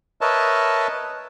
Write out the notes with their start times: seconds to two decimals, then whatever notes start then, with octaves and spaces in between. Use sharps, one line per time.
0.21 A#4 B4 C#5 D#5 E5 A5